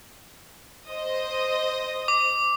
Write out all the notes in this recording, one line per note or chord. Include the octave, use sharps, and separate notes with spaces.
C5 D#5 D#6
D6